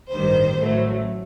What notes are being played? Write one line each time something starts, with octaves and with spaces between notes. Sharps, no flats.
A1 G2 D#3 G3 C5
A1 A2 F#3 A3